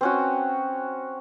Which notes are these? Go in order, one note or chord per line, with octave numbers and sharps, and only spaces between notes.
C4 C#4 F#4